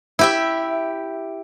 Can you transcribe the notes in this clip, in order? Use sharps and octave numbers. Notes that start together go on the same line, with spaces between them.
E4 G4 E5